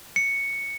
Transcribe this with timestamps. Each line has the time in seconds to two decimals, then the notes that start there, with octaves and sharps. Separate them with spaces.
0.16 C#7